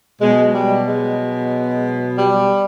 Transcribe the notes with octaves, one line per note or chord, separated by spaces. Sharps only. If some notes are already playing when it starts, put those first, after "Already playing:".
B2 F#3 G#3
G3
G#3
G3